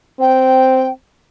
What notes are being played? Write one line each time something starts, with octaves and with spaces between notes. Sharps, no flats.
C4 G5